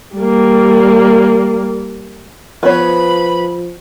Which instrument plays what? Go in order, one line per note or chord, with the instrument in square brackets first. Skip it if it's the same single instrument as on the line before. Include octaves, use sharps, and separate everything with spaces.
[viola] G3 A#3
[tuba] F3 [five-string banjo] B3 C#5 [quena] B5